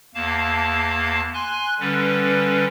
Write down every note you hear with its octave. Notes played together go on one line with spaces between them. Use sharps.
E2 A#3 F5 A5
G#5 C6 F#6
D3 G3 C#4 B4